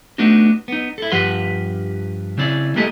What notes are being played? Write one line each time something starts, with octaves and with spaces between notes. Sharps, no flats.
A3 B3 D4 D#4 F#4
B3 D#4
E4 A4
G2 F3 G4 B4 F#5 C6
C#3 C4 E4 D5
G#3 A#3 E4 G4 A4 D#5